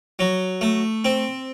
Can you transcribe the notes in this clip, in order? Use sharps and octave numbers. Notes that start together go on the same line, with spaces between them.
F#3
A3
C4